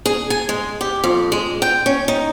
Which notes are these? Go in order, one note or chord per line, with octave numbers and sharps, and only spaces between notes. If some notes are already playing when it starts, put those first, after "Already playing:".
G#4
G#5
G#3
G4
F2
G#3
G5
C#4
D#4